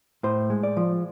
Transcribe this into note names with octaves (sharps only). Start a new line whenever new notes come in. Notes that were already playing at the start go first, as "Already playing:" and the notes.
A2 C5
G#3
D5
F3